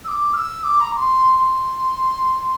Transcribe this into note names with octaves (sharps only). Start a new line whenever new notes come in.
E6
D6
F6
E6
D6
A#5
D6
C6
C6